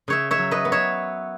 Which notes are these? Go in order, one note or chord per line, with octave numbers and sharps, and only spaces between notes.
C#3 C#5 E5
C#5 E5
F#3
B4 D#5
B3
C#5 E5